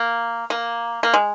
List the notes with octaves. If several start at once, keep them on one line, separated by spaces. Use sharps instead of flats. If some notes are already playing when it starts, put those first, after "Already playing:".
Already playing: A#3
A#3
A#3
G#3